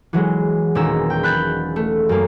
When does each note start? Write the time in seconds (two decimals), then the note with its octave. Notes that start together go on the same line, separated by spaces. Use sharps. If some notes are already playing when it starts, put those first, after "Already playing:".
0.13 E3 F#3 G#3
0.75 E1 A#2 D#3 C#4 A#5 E6
1.10 G5
1.23 B5 F#6 G6 A6
1.76 A3
2.09 F#2 A#3